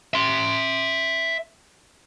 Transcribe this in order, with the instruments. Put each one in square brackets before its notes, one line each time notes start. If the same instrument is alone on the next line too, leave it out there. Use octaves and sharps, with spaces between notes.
[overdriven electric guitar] E5 C6